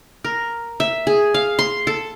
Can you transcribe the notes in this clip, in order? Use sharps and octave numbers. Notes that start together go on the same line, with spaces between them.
A#4
E5
G#4
F5
C6
A4